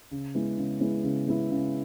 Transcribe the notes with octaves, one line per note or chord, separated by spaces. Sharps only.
C#3
G#3 B3 E4
C#3
G#3 B3 E4
C#3
G#3 B3 E4
C#3